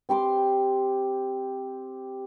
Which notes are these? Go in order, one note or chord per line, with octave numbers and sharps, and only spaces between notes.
C4 G4 C6 D6